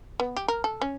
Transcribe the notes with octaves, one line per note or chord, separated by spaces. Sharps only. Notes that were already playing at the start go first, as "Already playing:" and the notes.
B3
G4
A#4
A4
C#4